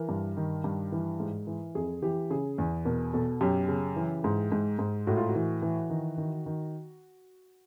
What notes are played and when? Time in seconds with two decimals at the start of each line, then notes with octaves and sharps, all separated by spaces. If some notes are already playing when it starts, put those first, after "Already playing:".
Already playing: E3 A#4
0.09 G2
0.37 D#3
0.64 G2
0.92 E3
1.20 G#2
1.47 E3
1.75 F2 G#4
2.02 E3 G4
2.30 C#3 G#4
2.58 E2
2.85 B2 A#4
3.13 B2 A4
3.41 F#2 G4
3.68 C#3
3.96 E3
4.24 G#2
4.52 G#2
4.79 G#2
5.07 A2 F#4
5.17 F4
5.29 F#4
5.35 E3
5.62 E3
5.90 D#3
6.18 D#3
6.46 D#3